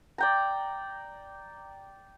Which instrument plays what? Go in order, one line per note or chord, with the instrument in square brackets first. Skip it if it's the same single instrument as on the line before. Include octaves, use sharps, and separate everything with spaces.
[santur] D5 G5 A#5